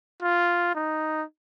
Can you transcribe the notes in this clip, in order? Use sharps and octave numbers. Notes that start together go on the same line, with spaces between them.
F4
D#4